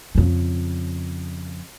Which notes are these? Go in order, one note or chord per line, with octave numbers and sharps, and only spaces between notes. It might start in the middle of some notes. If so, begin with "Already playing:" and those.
F2 C#3